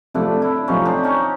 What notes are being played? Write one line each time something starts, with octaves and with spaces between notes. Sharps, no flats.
C3 F3 A3 D4 E4
D4 E4
C3 F3 A3 C#4 D#4
C4 D4
C#4 D#4